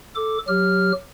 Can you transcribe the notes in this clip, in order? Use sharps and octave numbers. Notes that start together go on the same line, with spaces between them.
A4 D6
F#3 G4 F6